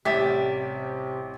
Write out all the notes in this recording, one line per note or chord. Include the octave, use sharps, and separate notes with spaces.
A1 C3 G3 G4 E5 B6